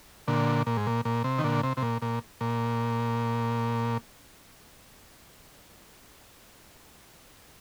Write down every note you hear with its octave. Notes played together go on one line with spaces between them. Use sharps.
A#2 D3
A#2
G#2
A#2
A#2
C3
D#3
A#2 D3
C3
C3
A#2
A#2
A#2